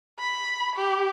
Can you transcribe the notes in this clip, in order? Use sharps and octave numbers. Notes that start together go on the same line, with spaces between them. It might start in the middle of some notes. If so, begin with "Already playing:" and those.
B5
G4